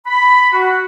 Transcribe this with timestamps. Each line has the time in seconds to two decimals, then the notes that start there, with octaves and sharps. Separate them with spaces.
0.05 B5
0.52 F#4